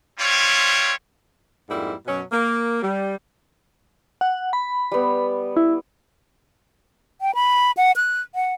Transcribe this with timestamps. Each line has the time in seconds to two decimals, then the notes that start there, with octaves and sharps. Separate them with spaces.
0.19 G3 C4 E4 F4 C#5
1.69 F2 G#2 G3 A#3 E4
2.06 F#2 B2 F#3 C#4
2.32 A#3
2.82 G3
4.21 F#5
4.53 B5
4.92 G3 B3
5.57 E4
7.21 G5
7.35 B5
7.77 F#5
7.96 F#6
8.35 F#5